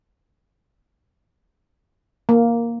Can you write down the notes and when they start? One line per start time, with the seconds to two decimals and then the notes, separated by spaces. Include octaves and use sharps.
2.29 A#3